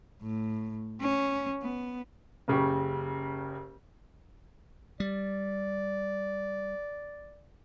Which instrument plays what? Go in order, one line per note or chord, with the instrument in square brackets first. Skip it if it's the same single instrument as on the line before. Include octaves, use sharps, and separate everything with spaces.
[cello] A2
C#4
B3
[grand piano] F#1 C#3 G4 C#6
[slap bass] G3 [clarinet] D5